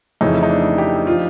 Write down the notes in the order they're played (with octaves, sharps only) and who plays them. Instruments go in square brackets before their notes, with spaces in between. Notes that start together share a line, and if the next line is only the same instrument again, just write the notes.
[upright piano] F2 C#3 E3 A3 C#4 [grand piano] D#4
[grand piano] D#4
D4
G4
[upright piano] F3 [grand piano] F4